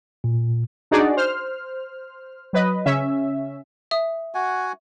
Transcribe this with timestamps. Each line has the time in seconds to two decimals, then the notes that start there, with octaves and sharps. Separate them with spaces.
0.24 A#2
0.91 D4 D#4 F#4 G#4 D5
1.17 C5 F6
2.53 F#3 B4 D#5
2.86 C#3 C#4 E5
3.91 E5 D#6
4.35 F#4 F#5 G#5